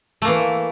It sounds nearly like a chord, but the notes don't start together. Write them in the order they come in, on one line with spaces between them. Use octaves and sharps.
A3 A#3 E3